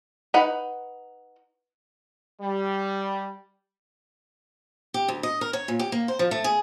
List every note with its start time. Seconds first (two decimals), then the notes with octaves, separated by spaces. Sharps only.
0.34 D#4 B4 F#5
2.40 G3
4.94 G4
5.08 D2
5.23 D#5
5.41 A#4
5.53 C#5
5.68 A#2
5.79 G4
5.92 A#3
6.08 C5
6.19 F3
6.31 A3
6.44 G#4